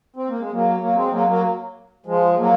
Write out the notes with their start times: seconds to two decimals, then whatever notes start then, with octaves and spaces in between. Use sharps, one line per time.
0.16 C4
0.29 A#3
0.39 G#3
0.52 F#3 A#3
0.80 F#3 A#3
0.95 G#3 C4
1.11 F#3 A#3
1.27 F#3 A#3
2.06 F3 G#3
2.38 F#3 A#3